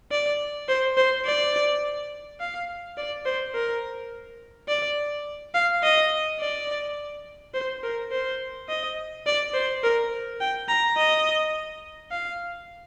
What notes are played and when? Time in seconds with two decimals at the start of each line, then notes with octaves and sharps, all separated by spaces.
0.11 D5
0.68 C5
0.97 C5
1.25 D5
2.40 F5
2.97 D5
3.25 C5
3.54 A#4
4.68 D5
5.54 F5
5.83 D#5
6.40 D5
7.54 C5
7.83 A#4
8.12 C5
8.69 D#5
9.26 D5
9.54 C5
9.84 A#4
10.40 G5
10.68 A#5
10.97 D#5
12.11 F5